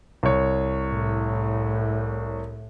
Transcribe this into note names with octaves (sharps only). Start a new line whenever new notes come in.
C2 C#5
A2